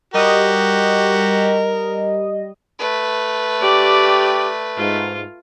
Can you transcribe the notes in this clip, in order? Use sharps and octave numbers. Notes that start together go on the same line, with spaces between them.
G3 F#4 G4 A#4 D#5
A3 B4
G4 D5
G#2 F4